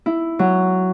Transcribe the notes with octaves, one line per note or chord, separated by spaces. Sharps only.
E4
F#3